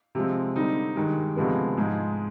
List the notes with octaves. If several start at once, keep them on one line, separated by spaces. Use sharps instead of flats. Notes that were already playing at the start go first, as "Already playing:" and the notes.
C3 F3 G#3 C4
D3 G3 C4 D#4
G2 D#3 G#3
D2 C3 F3 G#3 B3
G#2 F3 G#3